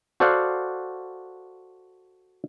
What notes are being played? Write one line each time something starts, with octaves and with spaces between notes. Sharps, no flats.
F#4 A4 C5 D5 F5 F#5